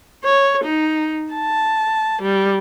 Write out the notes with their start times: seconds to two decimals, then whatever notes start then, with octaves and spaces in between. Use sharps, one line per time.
0.24 C#5
0.64 D#4
1.33 A5
2.22 G3